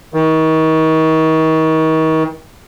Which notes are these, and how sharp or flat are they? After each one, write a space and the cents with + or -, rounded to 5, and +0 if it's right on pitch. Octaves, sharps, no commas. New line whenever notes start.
D#3 +35